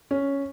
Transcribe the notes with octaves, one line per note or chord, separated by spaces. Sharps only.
C#4